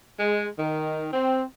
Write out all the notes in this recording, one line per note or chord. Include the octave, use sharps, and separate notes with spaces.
G#3
D#3
C4